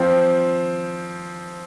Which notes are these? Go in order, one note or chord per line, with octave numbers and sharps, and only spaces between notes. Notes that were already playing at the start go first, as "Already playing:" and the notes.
Already playing: F3 C4